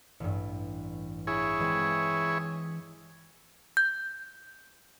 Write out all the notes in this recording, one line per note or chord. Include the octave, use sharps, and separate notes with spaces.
A1 G2
E4 G#4 C#5
E3 G#3 C4
G6